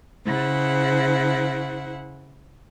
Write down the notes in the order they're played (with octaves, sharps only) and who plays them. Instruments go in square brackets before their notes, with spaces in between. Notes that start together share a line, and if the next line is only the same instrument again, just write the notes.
[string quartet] C#3 E4 C5 F#5